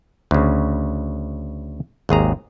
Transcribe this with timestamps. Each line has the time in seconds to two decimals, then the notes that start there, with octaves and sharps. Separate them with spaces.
0.31 D2 C#3
2.09 G#1 D#2 G#4 A#5